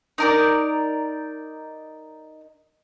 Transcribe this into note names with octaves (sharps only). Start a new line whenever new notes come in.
D#4 A#4 D5